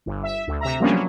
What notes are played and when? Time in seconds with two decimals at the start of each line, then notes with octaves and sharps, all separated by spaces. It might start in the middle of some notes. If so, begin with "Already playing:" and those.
0.06 G1
0.23 E5
0.47 D2
0.61 C3 E5 A#5
0.80 F3 G3 A#3 B3 C#4 D4
0.91 F#3